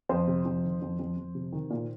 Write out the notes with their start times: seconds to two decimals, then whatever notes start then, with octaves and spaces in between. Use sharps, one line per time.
0.09 F2 C5
0.27 C3
0.45 F2
0.63 D#3
0.82 F2
0.99 F2
1.17 F2
1.35 C3
1.52 D#3
1.70 A#2